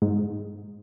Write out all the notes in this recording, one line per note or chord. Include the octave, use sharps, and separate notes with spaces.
G#2